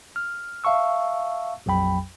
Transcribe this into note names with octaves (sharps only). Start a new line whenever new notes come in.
F6
E5 F5 A5 C#6 E6
A#1 F2 F#3 G5 B5